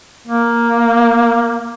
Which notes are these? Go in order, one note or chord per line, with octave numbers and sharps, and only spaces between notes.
A#3